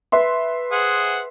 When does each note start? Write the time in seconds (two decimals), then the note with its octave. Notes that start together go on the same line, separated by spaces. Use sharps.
0.12 B4 E5 C6
0.72 G#4 C5 F#5